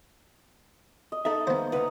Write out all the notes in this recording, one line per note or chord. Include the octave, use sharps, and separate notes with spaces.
D#5
D#4 A4 D#5 E5
D#3 A#3 B3 C5
D2 B4 F#5 A#5